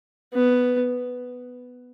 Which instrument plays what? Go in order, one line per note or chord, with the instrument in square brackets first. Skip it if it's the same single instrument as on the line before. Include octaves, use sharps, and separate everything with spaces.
[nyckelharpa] B3